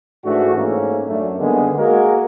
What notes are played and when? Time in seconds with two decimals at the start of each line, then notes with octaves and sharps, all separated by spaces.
0.24 G#2 E3 A3 D4 F#4
0.55 G#2 A3 A#3 C#4
1.08 F#2 A3 D4
1.38 D3 D#3 G3 G#3 A#3 B3
1.77 G#3 A#3 F#4 A#4